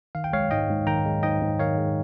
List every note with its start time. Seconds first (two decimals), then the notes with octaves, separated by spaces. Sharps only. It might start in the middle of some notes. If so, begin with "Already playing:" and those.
0.15 D#3 F5
0.24 G5
0.33 G#3 C#5 F5
0.51 G#2 D#5 G5
0.69 G#2
0.87 D#3 G5 A#5
1.05 G#3
1.23 G#2 D#5 G5
1.42 G#2
1.59 D#3 C#5 F5
1.78 G#3